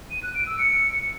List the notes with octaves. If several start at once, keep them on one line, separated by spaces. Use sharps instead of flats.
D#7
F#6
D7
E6
C#7